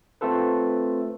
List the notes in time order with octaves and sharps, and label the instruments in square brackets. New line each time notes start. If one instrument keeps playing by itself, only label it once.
[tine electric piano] A3 C4 F4 A4 B4